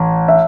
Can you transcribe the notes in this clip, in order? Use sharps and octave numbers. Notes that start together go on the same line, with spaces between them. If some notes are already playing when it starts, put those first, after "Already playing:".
Already playing: A1
E5